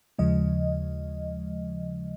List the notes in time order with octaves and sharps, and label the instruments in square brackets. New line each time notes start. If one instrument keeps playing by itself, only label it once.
[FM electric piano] D#2 C#3 F3 G#3 D#5